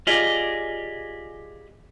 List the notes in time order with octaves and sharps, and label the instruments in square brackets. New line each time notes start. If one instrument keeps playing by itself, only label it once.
[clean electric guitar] F4 G4 G#4 D5 D#5